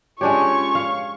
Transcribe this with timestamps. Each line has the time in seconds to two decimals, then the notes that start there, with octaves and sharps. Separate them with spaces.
0.21 G#3 C#4 D4 F4 G4 C#5 C#6
0.75 F5